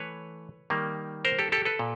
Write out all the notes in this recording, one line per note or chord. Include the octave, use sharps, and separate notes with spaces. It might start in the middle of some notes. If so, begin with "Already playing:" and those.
Already playing: E3 A3 B4 C#5
D#3 G3 A#3
A#4 C5
G4 A4
G4 A4
A4 B4
A#2